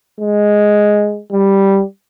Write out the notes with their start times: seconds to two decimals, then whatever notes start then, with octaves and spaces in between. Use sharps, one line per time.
0.20 G#3
1.31 G3